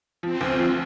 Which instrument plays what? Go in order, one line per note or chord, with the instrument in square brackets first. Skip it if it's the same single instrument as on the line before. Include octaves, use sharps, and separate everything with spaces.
[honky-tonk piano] F3 [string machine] C4
[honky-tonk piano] D2
F3